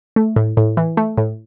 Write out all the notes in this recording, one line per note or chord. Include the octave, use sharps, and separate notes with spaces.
A3
A2
A2
E3
A3
A2